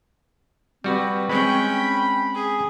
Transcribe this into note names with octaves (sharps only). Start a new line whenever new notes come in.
G3 C4 F#4 B4
G#3 C4 C#4 G5 B5
G#4